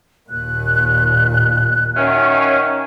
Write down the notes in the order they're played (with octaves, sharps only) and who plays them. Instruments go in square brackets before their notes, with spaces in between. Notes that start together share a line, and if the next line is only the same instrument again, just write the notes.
[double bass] D#2 A#2 [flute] F#6
[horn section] D#3 F#3 C#4 [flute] E5